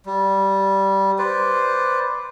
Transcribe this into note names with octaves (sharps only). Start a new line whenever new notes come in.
G3
B4 C5 D5